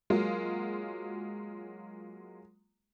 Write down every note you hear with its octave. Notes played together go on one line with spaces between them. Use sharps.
F#3 G#3 A#3 F4